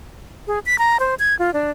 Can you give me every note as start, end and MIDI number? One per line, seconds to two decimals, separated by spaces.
0.47 0.59 68
0.66 0.79 95
0.79 0.97 82
1.00 1.15 72
1.19 1.37 92
1.39 1.53 65
1.54 1.71 62